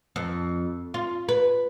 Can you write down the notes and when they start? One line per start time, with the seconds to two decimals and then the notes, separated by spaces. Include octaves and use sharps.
0.16 F2
0.94 F4
1.29 B4